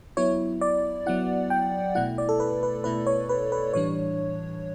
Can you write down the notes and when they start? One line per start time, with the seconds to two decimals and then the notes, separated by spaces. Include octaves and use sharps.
0.17 F#3 B3 E4 C#5
0.61 D5
1.06 F#3 B3 E4 F#5
1.50 G5
1.95 B2 A3 E4 F#5
2.18 D5
2.29 A4
2.40 B4
2.63 B4
2.84 B2 A3 E4 B4
3.07 C#5
3.29 B4
3.52 B4
3.73 A2 E3 G3 D4 C#5